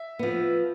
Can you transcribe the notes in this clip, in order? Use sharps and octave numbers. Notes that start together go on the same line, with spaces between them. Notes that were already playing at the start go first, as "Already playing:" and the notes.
Already playing: E5
F3 B3